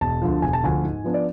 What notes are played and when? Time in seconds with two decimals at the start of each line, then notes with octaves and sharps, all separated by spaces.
0.01 E1 A5
0.22 D2 D3 F3
0.42 E1 G#5
0.53 A5
0.63 D2 D3 F3 G#5
0.83 G#2
1.04 F3 B3 D4
1.14 D5